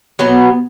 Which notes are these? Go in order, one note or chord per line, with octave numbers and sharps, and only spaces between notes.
B2 F#3 B3